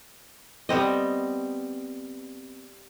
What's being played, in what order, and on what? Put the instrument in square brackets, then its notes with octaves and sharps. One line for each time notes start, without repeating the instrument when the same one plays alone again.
[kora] G3 B3 C4 D#5